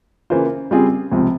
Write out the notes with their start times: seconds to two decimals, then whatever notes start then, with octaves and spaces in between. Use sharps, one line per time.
0.30 C#3 E3 A#3 F4 C5
0.71 C#3 G3 C4 F4 G#4
1.12 C#2 C3 F3